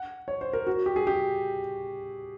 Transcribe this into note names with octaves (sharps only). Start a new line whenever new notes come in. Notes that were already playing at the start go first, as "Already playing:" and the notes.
Already playing: F#5
C#5
C5
A#4
F#4
G4
G#4
G4